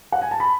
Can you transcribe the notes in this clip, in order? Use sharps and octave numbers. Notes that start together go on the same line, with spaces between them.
F#5
G#5
A5
B5